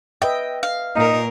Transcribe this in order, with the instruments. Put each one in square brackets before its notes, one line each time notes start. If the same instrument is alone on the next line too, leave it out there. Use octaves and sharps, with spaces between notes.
[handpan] B4 D#5 E5 [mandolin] G5
[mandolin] F5
[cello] A#2 A#4 [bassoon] D#4